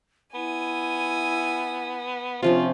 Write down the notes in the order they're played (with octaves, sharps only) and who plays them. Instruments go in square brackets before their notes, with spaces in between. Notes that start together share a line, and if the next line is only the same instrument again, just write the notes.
[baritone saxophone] B3 [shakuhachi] E4 [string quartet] G#5
[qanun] C3 F3 C#4 [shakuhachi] D4 [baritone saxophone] F4